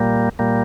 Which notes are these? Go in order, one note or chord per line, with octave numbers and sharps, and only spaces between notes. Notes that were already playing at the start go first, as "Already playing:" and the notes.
Already playing: A#2 G3 A#3
A#2 G3 A#3